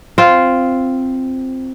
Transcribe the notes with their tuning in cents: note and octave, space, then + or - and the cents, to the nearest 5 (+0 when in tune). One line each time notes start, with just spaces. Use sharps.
C4 +0 F4 +0